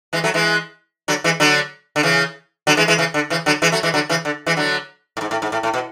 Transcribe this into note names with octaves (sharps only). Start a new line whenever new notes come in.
E3 G#3
F#3 A3
E3 G#3
D3 F#3
E3 G#3
D3 F#3
D3
C#3 E3
D3 F#3
E3 G#3
E3 G#3
C#3 E3
D3
C#3 E3
D3 F#3
E3 G#3
F#3 A3
E3 G#3
D3 F#3
C#3 E3
D3
E3 G#3
D3 F#3
A2
G#2
A2
G#2
A2
A2
B2